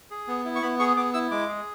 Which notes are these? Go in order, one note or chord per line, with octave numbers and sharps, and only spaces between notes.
G#4
B3
E4
C#6
B3 B5
G#4 C#6
B3 D6
E4 E6
G#3 D6
G#4